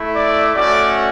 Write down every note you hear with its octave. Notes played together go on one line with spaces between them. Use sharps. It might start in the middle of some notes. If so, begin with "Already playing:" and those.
Already playing: A3 E4
D5
A3 C#4 F#4 D5